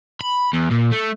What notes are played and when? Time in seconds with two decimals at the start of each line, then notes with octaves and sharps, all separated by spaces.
0.21 B5
0.54 E2
0.72 A#2
0.93 A3